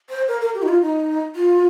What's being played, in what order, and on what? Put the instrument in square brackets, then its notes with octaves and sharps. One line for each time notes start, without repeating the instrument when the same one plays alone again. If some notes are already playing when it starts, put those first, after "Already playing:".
[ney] C5
A#4
A#4
G4
D#4
F4
D#4
F4